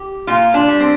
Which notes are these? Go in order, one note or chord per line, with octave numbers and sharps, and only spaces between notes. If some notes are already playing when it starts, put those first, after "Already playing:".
Already playing: G4
A#2 F4
D4
G3
C4